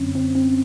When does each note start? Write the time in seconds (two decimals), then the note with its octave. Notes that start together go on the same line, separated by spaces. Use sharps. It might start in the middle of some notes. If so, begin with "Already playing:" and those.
Already playing: F#2 D3 F#3 C4 C#4
0.15 C4
0.35 C4